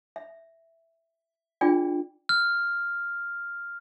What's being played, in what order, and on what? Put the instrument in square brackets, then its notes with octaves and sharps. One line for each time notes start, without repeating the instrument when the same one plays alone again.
[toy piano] E5
D4 F4 G#4 D5 G5
[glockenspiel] F6